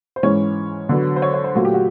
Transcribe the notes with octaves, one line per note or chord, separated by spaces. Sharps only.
C5
G#2 E3 G#3 C#4 C#5
D3 F#3 B3
C5
C#5
C#5
C5
A#2 F#3 A3 F#4
G4
F#4